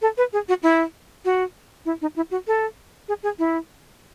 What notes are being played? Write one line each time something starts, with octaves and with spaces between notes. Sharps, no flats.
A4
B4
G#4
F#4
E4
F#4
E4
D#4
E4
F#4
A4
G#4
G#4
E4